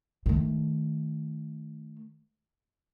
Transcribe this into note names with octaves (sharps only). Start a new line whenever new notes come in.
D#3 A3